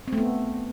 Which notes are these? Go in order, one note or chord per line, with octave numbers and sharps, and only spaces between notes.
C4
A3
B3